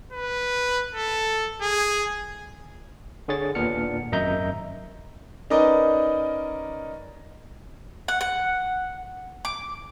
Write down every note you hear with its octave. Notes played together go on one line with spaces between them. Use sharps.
B4
A4
G#4
D3 G#4 C#5 A6
D#2 A#2 B3 D4 F6 C#7
G#1 F#2 D#5 E5 A#5 G6
C#4 D#4 A#4 B4 D5 D#5
F#5
F#5
D6